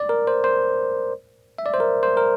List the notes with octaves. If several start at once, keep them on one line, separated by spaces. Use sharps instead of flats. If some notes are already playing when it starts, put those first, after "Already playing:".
Already playing: D5
A#4
C5
C5
E5
D5
C5
A#4
C5
A#4